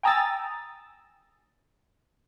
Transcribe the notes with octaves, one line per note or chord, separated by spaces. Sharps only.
G5 G#5 A#5 D#6 E6 A6